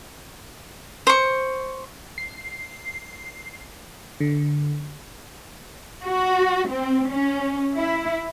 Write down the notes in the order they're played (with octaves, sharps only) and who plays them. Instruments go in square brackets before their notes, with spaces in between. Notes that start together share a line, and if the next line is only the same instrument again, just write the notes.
[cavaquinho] C5 C#6
[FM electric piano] C7
D3
[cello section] F#4
C4
C#4
E4